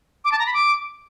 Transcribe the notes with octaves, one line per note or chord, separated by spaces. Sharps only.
D6
A5
A#5
B5
D6